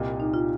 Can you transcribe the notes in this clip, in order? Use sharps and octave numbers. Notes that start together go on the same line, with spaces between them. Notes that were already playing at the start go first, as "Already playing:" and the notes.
Already playing: C2 A#2 A#3 G4 D#5
D#4
F4